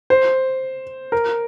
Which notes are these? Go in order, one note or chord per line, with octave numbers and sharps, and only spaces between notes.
C5
A#4